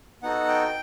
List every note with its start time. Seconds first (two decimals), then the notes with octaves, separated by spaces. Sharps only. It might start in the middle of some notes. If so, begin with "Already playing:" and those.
0.22 B3 D#4 F#4 A4 F#5
0.48 G5